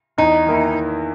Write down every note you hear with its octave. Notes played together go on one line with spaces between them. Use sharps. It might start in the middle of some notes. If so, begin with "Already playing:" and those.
E2 D#4
D#3 A#3 E4